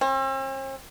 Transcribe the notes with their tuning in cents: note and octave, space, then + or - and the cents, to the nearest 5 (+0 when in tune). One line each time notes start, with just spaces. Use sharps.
C4 +45